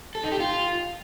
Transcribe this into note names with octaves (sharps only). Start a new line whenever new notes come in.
A4
D#4
G4
F4